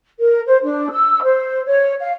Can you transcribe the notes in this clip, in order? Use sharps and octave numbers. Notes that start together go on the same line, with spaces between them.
A#4
C5
D4
E6
C5
C#5
F5